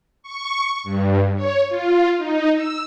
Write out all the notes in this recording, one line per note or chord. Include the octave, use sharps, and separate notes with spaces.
C#6
G2
C#5
F4
D#4
E6